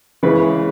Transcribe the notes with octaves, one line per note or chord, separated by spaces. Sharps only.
C#3 E3 G#3 B4